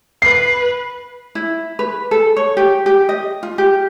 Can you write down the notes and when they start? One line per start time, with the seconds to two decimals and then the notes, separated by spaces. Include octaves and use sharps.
0.22 B4 C7
1.35 E4
1.79 B4
2.11 A4
2.37 C#5
2.57 G4
2.86 G4
3.09 D#5
3.43 F4
3.58 G4